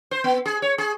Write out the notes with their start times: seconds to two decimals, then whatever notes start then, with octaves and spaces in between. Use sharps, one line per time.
0.11 C5
0.24 B3
0.46 G#4
0.62 C#5
0.78 G#4